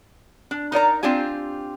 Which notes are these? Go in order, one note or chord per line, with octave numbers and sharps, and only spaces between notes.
D4
D#4 A#4 D5 A#5
C4 D4 F4 G4 G#5